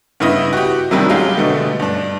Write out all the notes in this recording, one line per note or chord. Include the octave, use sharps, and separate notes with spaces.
G2 C#3 B3 E4 D#5 D#6
F#4 G4
C3 D#3 F#3 G3 D4
F#3 G#3 C#4 F4 G4
B2 D3 A3
G2 D4